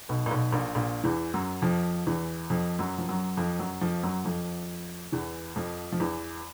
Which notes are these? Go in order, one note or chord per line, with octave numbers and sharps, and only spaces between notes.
B1 B2
A#2
B1 B2
A#1 A#2
A#1 A#2
E2 E3
F#2 F#3
F2 F3
E2 E3
F2 F3
F#2 F#3
F3
F#2 F#3
F2 F3
F#2 F#3
F2 F3
F#2 F#3
F2 F3
E2 E3
F2 F3
F3
E2 E3